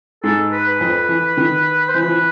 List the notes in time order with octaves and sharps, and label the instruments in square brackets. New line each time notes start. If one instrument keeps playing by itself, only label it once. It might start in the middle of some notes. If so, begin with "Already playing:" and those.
[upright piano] G#2 G#3 [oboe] A4
[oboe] B4
B4
[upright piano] F2 F3
E3
D#3
[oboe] C5
[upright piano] E3 [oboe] B4
[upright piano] F3
E3